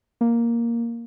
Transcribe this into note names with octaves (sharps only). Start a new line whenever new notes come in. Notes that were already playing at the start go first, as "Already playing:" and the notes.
A#3